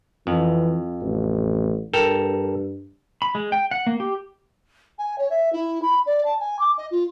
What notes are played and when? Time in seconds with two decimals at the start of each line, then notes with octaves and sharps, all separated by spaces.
0.27 F2 E3
1.02 A1
1.93 G2 A4 A#4 G5
3.22 B5
3.35 G#3
3.52 G5
3.71 F#5
3.87 A#3
4.00 G4
4.98 G#5
5.18 C#5
5.30 E5
5.53 E4
5.82 B5
6.06 D5
6.25 A5
6.40 G#5
6.59 D6
6.78 D#5
6.91 F4